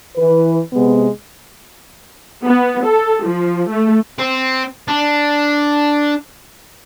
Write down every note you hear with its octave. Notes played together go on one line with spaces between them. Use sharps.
E3 B4
C3 G#3 B3
B3
A4
F3
A3
C4
D4